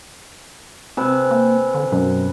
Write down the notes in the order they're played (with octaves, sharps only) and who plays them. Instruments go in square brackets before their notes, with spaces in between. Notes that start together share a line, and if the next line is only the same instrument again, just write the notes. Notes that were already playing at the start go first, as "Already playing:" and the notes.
[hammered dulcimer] C3 B4 G#5 [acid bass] C4
[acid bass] A#3
D3
[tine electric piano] F#2 [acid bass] B2